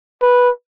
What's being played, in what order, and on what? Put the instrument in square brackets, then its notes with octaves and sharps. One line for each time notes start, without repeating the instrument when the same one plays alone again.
[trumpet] B4